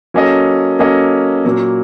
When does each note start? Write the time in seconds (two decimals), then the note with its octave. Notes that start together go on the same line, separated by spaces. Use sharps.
0.14 F#3 A#3 C#4 A4 D#5
0.79 F#3 A#3 C#4 A4 D#5
1.45 A#2 F#3 A#3